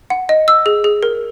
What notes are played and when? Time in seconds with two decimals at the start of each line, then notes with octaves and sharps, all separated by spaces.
0.10 F#5
0.29 D#5
0.48 E6
0.66 G#4
0.84 G#4
1.03 A#4